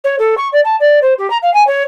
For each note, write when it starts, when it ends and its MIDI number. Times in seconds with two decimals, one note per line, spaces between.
0.04 0.16 73
0.19 0.35 69
0.37 0.48 85
0.52 0.60 74
0.64 0.76 81
0.80 0.99 74
1.02 1.14 72
1.18 1.30 67
1.30 1.37 82
1.42 1.53 77
1.53 1.65 80
1.67 1.83 73